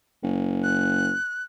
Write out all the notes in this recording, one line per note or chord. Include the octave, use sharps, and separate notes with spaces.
F#1
F#6